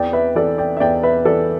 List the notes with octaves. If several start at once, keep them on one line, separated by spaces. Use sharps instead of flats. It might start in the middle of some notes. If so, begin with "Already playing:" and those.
Already playing: E2 D5 G5
B4 E5
E3 A4 D5
D5 G5
E5
E2 D5 G5
B4 E5
E3 A4 D5